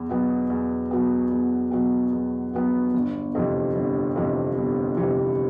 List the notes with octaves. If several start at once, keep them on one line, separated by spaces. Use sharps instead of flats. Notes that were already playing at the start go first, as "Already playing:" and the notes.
Already playing: E2
B2 F#3 B3
E2
B2 F#3 B3
E2
B2 F#3 B3
E2
B2 F#3 B3
G1
F2 C3 E3
G1
F2 C3 E3
G1
F2 C3 E3